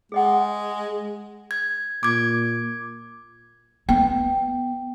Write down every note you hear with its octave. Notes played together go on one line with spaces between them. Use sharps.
G#3 G#4 D#5 F#5
G#6
A#2 D6 G#6
B3 G5